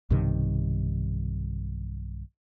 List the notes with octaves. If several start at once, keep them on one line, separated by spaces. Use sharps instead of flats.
B1 G2 C3 D#3